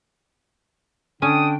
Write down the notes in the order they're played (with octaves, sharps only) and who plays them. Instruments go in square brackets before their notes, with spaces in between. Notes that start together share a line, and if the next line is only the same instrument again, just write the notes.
[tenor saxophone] D3 [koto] C#4 [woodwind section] D4 G5 [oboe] D#6